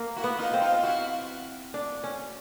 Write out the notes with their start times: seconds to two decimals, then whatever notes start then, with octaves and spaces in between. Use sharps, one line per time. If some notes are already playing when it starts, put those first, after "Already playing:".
Already playing: A#3
0.16 E4 F#4
0.24 B3
0.38 D#4 F4
0.54 C4
0.61 D#4 F4
0.74 F4
0.83 E4 F#4
1.74 D4
2.04 C#4